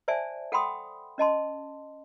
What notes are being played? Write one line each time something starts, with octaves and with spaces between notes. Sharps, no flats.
C5 D5 E5 G#5 A5
A4 F#5 G5 B5 C6 D#6
C#4 D#5 A5 C6